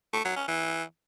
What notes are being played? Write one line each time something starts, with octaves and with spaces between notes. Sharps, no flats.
A3
F#3
C#4
E3